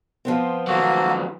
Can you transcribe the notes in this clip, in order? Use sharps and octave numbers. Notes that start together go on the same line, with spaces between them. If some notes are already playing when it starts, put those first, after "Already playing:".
F3 B3 C4
D#3 F#3 A#3 F#4 A4